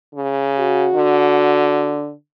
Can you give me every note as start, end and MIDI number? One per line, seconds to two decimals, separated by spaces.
0.15 0.89 49
0.59 2.01 66
0.95 2.12 50